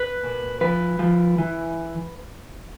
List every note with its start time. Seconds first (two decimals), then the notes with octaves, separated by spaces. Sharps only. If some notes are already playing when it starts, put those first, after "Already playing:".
Already playing: B4
0.23 A#2
0.61 F3 B4
0.99 F3
1.38 E3